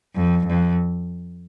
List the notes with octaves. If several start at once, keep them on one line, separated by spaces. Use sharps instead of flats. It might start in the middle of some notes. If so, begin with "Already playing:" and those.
F2
F2